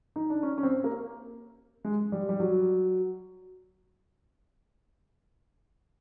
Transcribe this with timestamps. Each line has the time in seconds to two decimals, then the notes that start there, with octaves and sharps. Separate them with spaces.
0.16 D#4
0.30 D4
0.43 C#4
0.58 C#4
0.63 C4
0.84 A#3
1.85 G#3
2.12 G3
2.29 G3
2.40 F#3